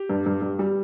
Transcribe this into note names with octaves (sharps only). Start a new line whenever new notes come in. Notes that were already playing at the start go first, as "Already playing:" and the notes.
Already playing: G4
G2
G2
G2
G3